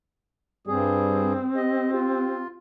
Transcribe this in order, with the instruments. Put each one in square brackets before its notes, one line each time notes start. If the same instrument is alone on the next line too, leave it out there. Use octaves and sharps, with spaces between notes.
[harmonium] G2 G#4 [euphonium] G3 [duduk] C4
[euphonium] G4 [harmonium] D#5
[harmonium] F4 [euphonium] G4